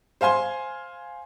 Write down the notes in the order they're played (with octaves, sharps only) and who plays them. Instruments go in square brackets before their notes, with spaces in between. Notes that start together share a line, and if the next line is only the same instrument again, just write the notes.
[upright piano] C5 F5 G#5 C6